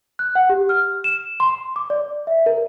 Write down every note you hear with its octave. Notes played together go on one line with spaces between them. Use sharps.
F#6
F#5
G4
F6
E7
C6
D6
D5
E5
A#4